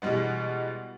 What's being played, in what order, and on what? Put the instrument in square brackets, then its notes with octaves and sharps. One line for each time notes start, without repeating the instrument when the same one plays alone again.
[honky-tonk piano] B2 E3 G3 G#3 B3